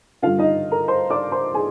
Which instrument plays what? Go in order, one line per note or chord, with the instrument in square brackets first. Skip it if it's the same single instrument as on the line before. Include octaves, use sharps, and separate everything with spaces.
[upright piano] G2 D3 F4 F5
D#4 D#5
A#4 A#5
C5 C6
D5 D6
C5 C6
G#4 G#5